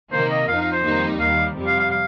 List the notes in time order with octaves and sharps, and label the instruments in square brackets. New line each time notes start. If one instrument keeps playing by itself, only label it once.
[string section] C3 D#3 A#3 [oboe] C5
[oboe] D#5
[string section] F2 F3 D#4 [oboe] F5
[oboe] F5
C5
[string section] F2 D#3 G3 A#3 D#4
[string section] D#2 D#3 G3 [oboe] F5
[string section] F2 C3 G3
[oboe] F5
F5
F5